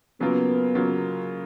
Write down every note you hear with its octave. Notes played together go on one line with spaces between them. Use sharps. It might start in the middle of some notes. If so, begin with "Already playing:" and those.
C#3 F#3 A#3 B3 F4 A#4
C#3 F#3 A#3 F4 A#4